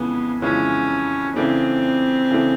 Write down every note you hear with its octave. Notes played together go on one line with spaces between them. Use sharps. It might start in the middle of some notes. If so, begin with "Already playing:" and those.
Already playing: F2 C#3 E3 G#3 B3
F2 C#3 E3 G#3 C#4
C#3 E3 A3 C4 D4
C#3 E3 A3 D4